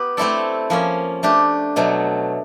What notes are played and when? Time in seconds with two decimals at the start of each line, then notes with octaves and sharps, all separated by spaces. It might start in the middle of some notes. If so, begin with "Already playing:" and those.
Already playing: B3 G4 B4
0.17 A3 C4 E4 A4 D5
0.70 F3 A#3 C#4
1.23 A3 D4 G4
1.76 B2 F#3 A3